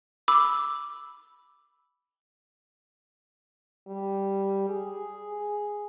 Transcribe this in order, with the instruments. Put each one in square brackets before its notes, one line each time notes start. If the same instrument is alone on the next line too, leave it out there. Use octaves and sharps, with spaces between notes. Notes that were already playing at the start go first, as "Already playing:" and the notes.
[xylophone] B5 D6 E6
[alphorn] G3
G#4